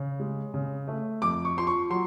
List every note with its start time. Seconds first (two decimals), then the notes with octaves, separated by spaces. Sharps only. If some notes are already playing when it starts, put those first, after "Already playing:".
Already playing: C#3
0.20 G#3
0.54 C#3
0.88 A3
1.22 F2 D6
1.45 C#6
1.57 F3 C6
1.67 C#6
1.90 F#3 C6